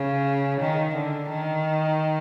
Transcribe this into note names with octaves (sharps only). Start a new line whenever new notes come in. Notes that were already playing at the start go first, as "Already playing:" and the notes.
Already playing: C#3
D#3
D3
D#3